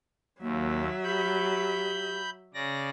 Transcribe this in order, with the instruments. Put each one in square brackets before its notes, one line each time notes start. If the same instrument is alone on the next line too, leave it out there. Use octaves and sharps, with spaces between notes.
[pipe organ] D#2 [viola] F#3 E5 [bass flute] A#3
[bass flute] G4 [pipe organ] B5 G6
[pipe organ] C#3 D5 A#6